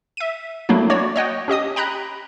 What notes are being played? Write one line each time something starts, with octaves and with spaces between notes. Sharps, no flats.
E5 D#7
F#3 A3 A#3 D4 E4
F#4 C#5 D5
C#5 D#5 F#5 G5
C#4 G4 D#5 D#6
G5 A#5 B5 F#6